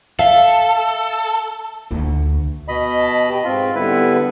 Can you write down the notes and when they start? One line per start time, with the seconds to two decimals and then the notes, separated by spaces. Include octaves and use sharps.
0.19 A4 E5 F5
1.91 D2
2.68 B2 D#5 B5
2.99 A5
3.29 G4
3.44 G#2 C4 F4
3.75 D3 G3 B3 E4 B4